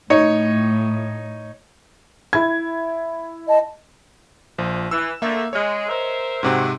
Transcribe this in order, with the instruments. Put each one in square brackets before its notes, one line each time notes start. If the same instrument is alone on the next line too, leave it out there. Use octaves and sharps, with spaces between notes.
[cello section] A2 [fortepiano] D#4 C#5
[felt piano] E4 G#6
[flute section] D#5 A5
[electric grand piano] A#1 F3
[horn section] E3 [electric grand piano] E6
[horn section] D3 A3 [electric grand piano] A#3 E5
[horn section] G#3 [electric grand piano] C#5 D#5
[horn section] A#4 C5 E5
[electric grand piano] G#2 C3 C4 [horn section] F#3